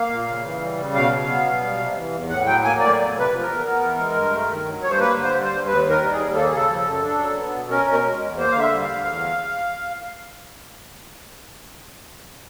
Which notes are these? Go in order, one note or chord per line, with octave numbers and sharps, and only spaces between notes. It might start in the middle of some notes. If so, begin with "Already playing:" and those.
Already playing: A#3 F5
A#2
C#3
E3
G3
C#3
B2 F5
F#3
B3
B2
G3
C3
E3
E2
A2 F#5
F#3 G5
A#3 G#5
A2 D5
E2
C3
B4
F3
A#4
E2
B3
E3
G#3
G2
A3
D#3
F#3
G2 C#5
C5
A#3 B4
D3
C5
G3
C5
G2
D#2 B4
D#3
A#4
G3
G#4
D#2
A#3 A4
G#4
C#3 A4
F3
F#2
D4
F#3
B3
B2
C#4 A#4
B2
A#4
G#3
E2
A#3 C5
D3 F5
E5
G3
F5
D2
E2